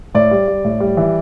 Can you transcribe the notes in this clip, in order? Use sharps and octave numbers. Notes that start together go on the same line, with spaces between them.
A2 D5
G3
G3
A2
G3
E3